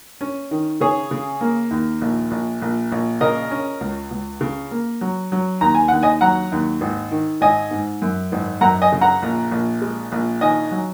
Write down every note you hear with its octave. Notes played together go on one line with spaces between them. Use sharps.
C#4
D#3
C#3 G#4 C#5
C#3
A#3
D#2
A#1
A#1
A#1
A#1
C#3 A#4 D#5
C#4
C#2
C#2
C#3
A#3
F#3
F#3
D#2 A#5
G#5
D#2 F#5
D#5 G#5
F#3 F#5 A#5
D#2
G#1
D#3
G#1 D#5 G#5
G#2
F#2
G#1
F#2 F#5 A#5
D#5 G#5
C#3
F#5 A#5
A#1
A#1
G#3
A#1
D#3 D#5 G#5
F#3